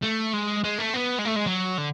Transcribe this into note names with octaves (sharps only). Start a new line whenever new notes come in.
A3
G#3
G#3
A3
B3
G#3
A3
G#3
F#3
D3